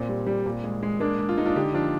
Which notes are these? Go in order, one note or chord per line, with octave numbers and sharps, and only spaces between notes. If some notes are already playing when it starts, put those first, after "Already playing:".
Already playing: A#2 C4
G3
G3
A#2
G#3
G#3
G#3 A#3 D4
G#3
F4
G#3 D#4
D4 F4
D3 D#4 G4
F3 D4 F4